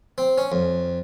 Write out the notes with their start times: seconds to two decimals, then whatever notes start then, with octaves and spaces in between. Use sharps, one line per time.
0.18 C4
0.38 C#4
0.52 F2